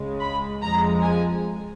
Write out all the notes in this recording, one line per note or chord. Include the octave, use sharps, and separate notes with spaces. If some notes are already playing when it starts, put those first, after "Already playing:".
Already playing: C#2 C#3 G#3
B5
F2 F3 G#3 A#5
G#5